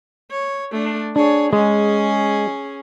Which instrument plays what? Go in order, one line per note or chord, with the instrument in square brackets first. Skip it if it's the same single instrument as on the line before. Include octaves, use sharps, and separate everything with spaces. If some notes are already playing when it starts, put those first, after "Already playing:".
[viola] C#5
A3 D4
[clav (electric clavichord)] D4 [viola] G#4 C#5
[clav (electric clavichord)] G#3 [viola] C#4 G#4